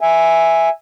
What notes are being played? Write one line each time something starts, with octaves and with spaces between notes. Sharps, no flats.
E5 G#5